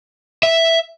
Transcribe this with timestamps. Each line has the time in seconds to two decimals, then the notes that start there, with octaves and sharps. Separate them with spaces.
0.43 E5